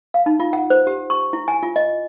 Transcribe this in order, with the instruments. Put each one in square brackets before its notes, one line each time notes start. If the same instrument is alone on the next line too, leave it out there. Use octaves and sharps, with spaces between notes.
[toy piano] F5
D#4
F4
F#5
C5
G4
C#6
E4
G#5
F4
D#5